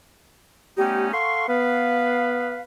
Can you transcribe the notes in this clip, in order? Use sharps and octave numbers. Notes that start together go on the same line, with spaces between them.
G3 A3 B3 C#4 D#4 G4
A4 F5 F#5 C6 C#6
B3 B4 F5